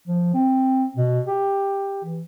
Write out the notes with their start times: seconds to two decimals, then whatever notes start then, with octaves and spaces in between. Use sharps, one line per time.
0.07 F3
0.34 C4
0.97 B2
1.27 G4
2.05 E3